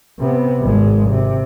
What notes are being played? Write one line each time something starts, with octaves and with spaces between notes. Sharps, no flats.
C3 B3
G#1 G#3
C3